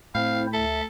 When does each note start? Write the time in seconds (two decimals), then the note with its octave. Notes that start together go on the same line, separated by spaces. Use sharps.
0.15 A2 C4 E4 C5 F5
0.53 D2 A4 E5